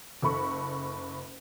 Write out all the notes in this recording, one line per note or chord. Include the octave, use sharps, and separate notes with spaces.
F#1 A4 B5 C#6